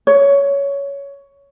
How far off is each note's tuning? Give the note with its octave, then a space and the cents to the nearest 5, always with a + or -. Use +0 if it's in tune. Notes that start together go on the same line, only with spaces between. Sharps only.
C#5 +15